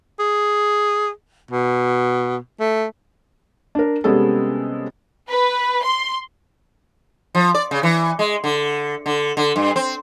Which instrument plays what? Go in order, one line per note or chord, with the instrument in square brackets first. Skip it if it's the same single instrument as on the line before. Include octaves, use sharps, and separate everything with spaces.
[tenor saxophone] G#4
B2
A3
[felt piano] D4 A#4
C3 G3 G#3 B3 C#4 A4
[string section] B4
C6
[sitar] F3
D5
C#3
E3
G#3
D3
D3
D3
G2
C4